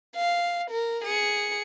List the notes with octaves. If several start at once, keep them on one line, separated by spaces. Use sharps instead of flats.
F5
A#4
G#4 C#7